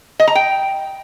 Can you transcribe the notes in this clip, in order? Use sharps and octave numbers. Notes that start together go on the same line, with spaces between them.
D#5
A#5
G5